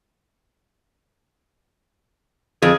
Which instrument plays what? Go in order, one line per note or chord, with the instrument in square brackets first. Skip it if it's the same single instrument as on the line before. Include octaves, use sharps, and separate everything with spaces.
[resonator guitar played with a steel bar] F2 [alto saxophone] G#4